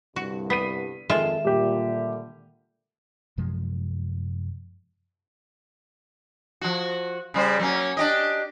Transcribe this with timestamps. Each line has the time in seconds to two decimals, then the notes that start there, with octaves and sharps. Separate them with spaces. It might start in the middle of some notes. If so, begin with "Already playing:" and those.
0.16 C2 G2 D3 F#4
0.50 B3 B6 C7 D#7
1.10 F2 D#3 G#3 F4 A4 E5
1.45 A#2 D3 G3 G4
3.38 F#2 C3 F3 G#3
6.61 F3 F#4
7.34 C#3 G3 C5
7.60 F#3 A#3 C#4
7.97 D4 G4 D#5